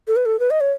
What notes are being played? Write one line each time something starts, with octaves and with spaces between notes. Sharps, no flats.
A4
B4
A4
B4
D#5
C#5